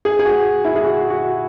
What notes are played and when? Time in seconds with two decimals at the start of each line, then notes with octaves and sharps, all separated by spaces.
0.05 G#4
0.19 G#4
0.25 F#4
0.64 E4
0.75 G#4
0.84 F#4
1.10 F#4